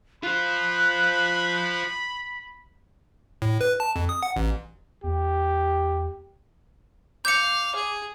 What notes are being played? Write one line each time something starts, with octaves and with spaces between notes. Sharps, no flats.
F4 C5 B5 F#6
A2
B4
A5
F2
D#6
F#5
A1
E2 G4
F5 D6 G6 C#7
G#4